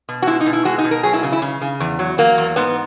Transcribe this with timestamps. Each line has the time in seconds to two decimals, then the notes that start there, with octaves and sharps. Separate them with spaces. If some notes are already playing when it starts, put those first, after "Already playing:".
0.09 B2
0.22 F#4
0.27 G#3 E4
0.40 D#4
0.46 B2
0.53 E4
0.65 G#3 F#4
0.78 D#4
0.84 B2
0.91 A#4
1.03 F#3 G#4
1.13 E4
1.23 C#3
1.32 E4
1.42 C#3
1.61 C#3
1.80 E2
1.99 F#3
2.18 F#3 A#3
2.38 E2
2.56 G#2 B3